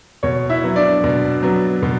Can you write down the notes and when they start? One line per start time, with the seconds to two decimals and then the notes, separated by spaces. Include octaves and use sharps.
0.23 B2 C#5
0.50 E4 E5
0.64 F#3 B3
0.76 D4 D5
1.04 B2
1.43 F#3 B3
1.83 B2